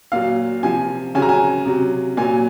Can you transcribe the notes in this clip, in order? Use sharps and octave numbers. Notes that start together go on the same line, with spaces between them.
A#2 F#3 F5
C3 F3 G#5
C#3 F#3 G#5
A#5
G#5
C3 F#3
A#2 F#3 G#5